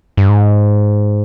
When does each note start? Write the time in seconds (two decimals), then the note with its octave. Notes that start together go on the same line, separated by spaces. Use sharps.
0.17 G2
0.29 G#2